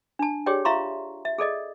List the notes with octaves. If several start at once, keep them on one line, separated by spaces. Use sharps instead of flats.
D4 A5
G4 G#4 C#5 D5 G5
F4 E5 F5 A#5 C6 C#6
E5
G#4 A4 D5 D#5